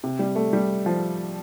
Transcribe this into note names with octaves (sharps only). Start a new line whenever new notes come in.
C3
G3
A3
G3
F3